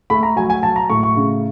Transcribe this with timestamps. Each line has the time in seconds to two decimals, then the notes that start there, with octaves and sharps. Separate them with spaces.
0.10 A3 B5
0.23 A#5
0.36 F#3 G#5
0.50 G#5
0.63 F#3 A5
0.76 A#5
0.90 A2 C#6
1.03 C#6
1.16 C#3